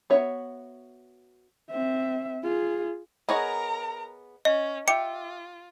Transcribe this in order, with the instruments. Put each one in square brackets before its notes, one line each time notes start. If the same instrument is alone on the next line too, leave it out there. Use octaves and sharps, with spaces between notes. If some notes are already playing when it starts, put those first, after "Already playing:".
[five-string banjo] B3 F#4 C#5 E5
[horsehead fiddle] C4 E5
F4 G#4
[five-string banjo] B3 G#4 C#5 [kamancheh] A#4 A#5 [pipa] D#5
[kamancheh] C#4 [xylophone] D#5
[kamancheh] F4 [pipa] G4 [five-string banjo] E5 [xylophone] C#7